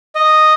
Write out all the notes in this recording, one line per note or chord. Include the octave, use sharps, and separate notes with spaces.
D#5